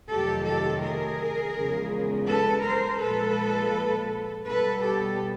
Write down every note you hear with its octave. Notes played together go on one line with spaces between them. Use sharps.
F2 C3 D#3 F#3 A3 G4 A4
G4 A4
G#4 A#4
E2 C#3 F3 G#3
A4 B4
A#4 C5
A#2 F3 G#3 A4 B4
B2 G3 B3 A4 B4
G4 A4